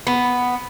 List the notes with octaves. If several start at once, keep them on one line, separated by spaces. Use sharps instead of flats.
B3